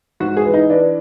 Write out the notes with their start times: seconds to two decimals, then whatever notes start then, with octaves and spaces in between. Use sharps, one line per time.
0.20 G#2 F#4
0.37 G#4
0.45 E3
0.54 D#4
0.69 E3 D4